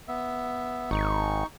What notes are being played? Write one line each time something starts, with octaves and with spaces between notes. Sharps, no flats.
B3 E5
G#1 D#4 C#6